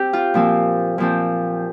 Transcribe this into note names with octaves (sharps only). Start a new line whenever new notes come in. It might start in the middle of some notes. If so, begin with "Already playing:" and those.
Already playing: C4 G4
F4
A#2 F3 C4
A#2 F3 C4